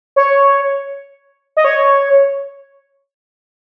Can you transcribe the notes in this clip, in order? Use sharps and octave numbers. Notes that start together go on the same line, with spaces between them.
C#5
D#5
C#5